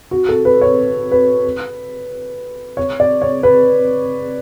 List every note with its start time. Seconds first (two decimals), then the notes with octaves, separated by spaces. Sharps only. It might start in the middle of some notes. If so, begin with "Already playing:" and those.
0.11 F#4
0.29 A4
0.45 B4
0.61 C#5
1.12 B4
2.77 C#5
3.00 D5
3.22 C#5
3.43 B4